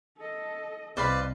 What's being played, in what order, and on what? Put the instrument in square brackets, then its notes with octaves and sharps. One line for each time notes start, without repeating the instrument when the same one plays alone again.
[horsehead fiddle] A4 D#5
[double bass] C2 [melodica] B4 D5 [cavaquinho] C5 F5 B5 [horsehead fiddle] D#5